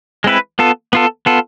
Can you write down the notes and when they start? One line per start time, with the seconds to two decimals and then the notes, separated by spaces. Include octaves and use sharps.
0.24 G#3 C4 E4 B4
0.59 B3 F4 A4
0.93 B3 F4 A4
1.26 B3 F4 A4